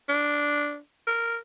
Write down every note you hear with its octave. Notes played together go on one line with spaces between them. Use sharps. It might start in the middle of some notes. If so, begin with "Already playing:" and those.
D4
A#4